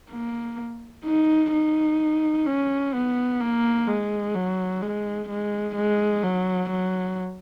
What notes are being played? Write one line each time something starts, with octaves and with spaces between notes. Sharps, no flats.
A#3
D#4
D#4
C#4
B3
A#3
G#3
F#3
G#3
G#3
G#3
F#3
F#3